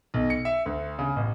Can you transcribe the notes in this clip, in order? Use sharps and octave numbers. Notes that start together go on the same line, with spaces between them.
B1
C#7
E5
D2
C#3
A1